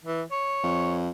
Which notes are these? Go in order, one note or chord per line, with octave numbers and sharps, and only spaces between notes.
E3
C#5
F2